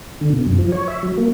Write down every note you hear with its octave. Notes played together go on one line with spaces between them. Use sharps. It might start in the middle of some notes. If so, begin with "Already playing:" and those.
D3
B2
F#2
F3
C#5
E5
F#3
A#3